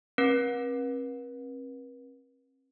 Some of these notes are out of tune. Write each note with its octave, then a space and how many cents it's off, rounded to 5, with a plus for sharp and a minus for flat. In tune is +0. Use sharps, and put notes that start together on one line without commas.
C4 +40 B4 -45